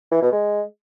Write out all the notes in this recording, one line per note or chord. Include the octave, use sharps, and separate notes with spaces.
E3
B2
G#3